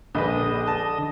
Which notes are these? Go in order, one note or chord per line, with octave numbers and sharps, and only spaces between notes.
A#1 D3 B4 D#5
A5